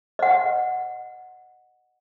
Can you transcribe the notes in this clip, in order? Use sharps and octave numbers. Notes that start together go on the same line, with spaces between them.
D#5 F#5